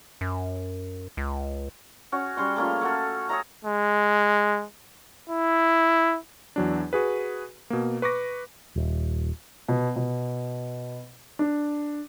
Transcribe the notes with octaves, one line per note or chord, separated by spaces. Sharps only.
F#2
C#2
C#4 F#4 C#5
G3 C#4 C6 C#6
A3 A#3 C#4 F4
A3 F#4 A4
G#4 C#5 E5 A#5
G#3
E4
E2 F#3 D4
F#4 G#4 B4
B2 A#3
B4 C#6 D6 A#6
D#1
B2
B2
D4